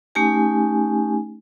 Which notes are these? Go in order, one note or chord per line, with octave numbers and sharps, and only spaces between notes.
A3 C#4 D#4 G4 G#5